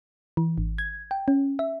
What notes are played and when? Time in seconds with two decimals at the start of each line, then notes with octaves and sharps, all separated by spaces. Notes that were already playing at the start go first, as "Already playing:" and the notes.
0.37 E3
0.58 G#1
0.78 G#6
1.11 G5
1.28 C#4
1.59 E5